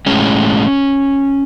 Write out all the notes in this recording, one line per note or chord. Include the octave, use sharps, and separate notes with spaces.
A2 G#3 C#4